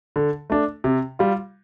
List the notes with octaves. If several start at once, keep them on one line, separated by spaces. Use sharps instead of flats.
D3
A3 D4
C3
G3 F4